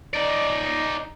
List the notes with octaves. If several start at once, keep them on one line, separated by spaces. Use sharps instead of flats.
D#4 D5